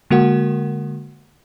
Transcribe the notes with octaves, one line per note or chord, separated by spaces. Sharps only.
D3 G#3 A#3 F#4 A#4 F#5